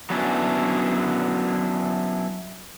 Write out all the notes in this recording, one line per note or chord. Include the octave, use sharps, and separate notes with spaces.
F#3 B3 C#4 D4 E4